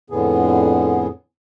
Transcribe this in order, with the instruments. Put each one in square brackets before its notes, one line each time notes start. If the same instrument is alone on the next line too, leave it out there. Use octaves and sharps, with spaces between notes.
[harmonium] F2 A2 D3 B3 G#4